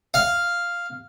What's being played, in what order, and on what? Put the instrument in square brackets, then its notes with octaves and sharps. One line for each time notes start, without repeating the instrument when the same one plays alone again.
[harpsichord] F5